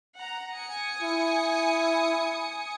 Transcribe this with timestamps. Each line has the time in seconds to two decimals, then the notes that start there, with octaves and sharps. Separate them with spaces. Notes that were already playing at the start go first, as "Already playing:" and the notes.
0.18 F#5 A#5
0.54 G#5 D#6 C#7
1.02 E4